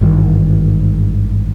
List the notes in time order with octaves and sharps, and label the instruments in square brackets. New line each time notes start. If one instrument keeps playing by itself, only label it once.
[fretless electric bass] G#1 G2 D#3 E3